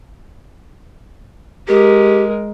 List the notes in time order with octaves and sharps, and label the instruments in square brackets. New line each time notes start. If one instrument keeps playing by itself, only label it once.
[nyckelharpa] G#3 A#4 [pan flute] G4